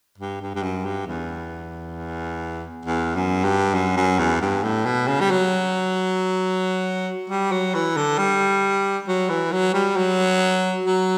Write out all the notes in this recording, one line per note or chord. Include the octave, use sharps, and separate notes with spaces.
G2
G2
G2
F#2
G2
E2
E2
F#2
G2
F#2
F#2
E2
G2
A2
B2
C#3
G3
F#3
G3
F#3
E3
D3
G3
F#3
E3
F#3
G3
F#3
F#3